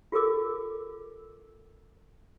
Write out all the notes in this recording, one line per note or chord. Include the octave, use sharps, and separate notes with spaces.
F4 G4 A4 A#4 D6